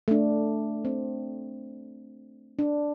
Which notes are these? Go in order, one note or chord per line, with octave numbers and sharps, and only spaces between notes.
A3 D4
C4
D4